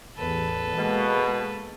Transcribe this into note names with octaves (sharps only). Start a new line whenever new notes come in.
A1 E2 A4 B4
B2 G#3 A#3